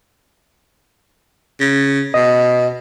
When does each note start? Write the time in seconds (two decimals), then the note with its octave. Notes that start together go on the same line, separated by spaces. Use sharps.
1.60 C#3
2.14 B2 D#5